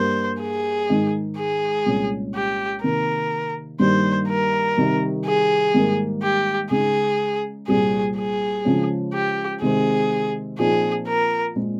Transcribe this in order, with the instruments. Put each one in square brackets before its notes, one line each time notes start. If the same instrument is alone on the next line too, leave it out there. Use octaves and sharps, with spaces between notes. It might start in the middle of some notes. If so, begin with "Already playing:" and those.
Already playing: [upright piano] G2 G3 A#3 [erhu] C5
[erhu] G#4
[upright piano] G#2 D#3 G#3 D#4
[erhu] G#4
[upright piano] C2 A#2 G#3 C#4
[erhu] G4
[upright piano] C3 D#3 A#3 [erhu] A#4
[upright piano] G2 D#3 G3 A#3 [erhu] C5
[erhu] A#4
[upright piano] C3 D#3 G3
[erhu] G#4
[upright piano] G#2 D#3 G3 A#3 D#4
[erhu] G4
[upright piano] C#3 G#3 D#4 [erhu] G#4
[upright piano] C2 A#2 G3 C4 G4 [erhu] G#4
[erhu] G#4
[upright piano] C#3 F3 G#3 C#4
[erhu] G4
[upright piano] C3 D#3 G#3 C4 [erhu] G#4
[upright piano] A#2 F3 C4 D#4 [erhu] G#4
[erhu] A#4
[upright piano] A#2 G#3 C4